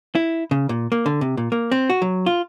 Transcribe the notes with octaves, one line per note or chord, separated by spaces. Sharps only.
E4
C#3
A#2
A#3
D3
C3
A#2
A#3
C4
F#4
F#3
F4